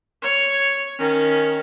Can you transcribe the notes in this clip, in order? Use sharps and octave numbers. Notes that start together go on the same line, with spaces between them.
C#5
D#3 C#4